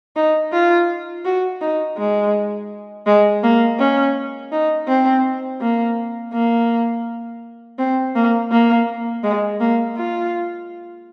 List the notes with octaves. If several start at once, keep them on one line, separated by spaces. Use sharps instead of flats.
D#4
F4
F#4
D#4
G#3
G#3
A#3
C#4
D#4
C4
A#3
A#3
C4
A#3
A#3
G#3
A#3
F4